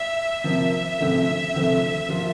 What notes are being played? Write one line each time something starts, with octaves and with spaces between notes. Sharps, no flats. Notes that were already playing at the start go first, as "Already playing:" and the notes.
Already playing: E5
C3 F3 A#3 E5
D2 C3 F3 A3
D2 C3 F3 A3
F3 A#3 F4